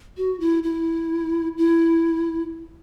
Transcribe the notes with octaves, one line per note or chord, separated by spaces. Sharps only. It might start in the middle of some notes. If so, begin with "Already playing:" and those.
F#4
E4
E4
E4